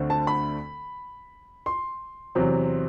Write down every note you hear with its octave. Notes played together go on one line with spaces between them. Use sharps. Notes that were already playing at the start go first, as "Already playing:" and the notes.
Already playing: D2 D3 A3 C4
A5
B5
C6
E2 C3 F#3 C4